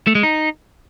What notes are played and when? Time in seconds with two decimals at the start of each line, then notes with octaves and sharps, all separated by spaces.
0.07 A3
0.15 G#3
0.23 D#4